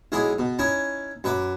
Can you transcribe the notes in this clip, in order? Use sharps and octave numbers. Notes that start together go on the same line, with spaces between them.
B1 G#3 D#4 E4 G#4 D#6
B2
C#4 D#4 E4 G#5
F#2 B4 E5 D6